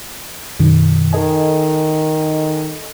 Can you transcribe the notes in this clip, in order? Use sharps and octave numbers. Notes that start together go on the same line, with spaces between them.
F#2 B2 D#3
D#3 A4 D#5 G#5